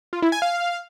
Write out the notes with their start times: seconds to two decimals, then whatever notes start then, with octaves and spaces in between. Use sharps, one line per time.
0.13 F4
0.22 E4
0.32 G#5
0.42 F5